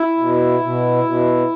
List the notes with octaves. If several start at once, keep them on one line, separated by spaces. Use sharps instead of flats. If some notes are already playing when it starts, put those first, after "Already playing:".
Already playing: E4
B2
B2
B2